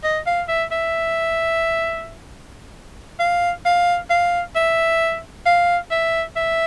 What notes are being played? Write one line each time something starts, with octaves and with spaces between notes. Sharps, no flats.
D#5
F5
E5
E5
F5
F5
F5
E5
F5
E5
E5